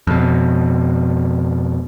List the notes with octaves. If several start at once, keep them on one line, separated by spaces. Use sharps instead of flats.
F2 B2